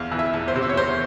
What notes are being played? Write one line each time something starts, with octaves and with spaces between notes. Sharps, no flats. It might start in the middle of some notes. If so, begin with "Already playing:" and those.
Already playing: E2 F5
E3
E5
E2
C5
C3
E5
C#5
E2 C5